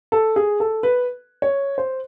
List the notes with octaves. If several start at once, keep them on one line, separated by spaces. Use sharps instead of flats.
A4
G#4
A4
B4
C#5
C5